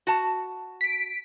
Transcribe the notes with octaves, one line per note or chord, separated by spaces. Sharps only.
F#4 A5
B6 D7